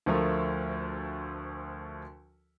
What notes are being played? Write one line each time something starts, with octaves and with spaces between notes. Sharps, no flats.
D2 F3 A3 A#4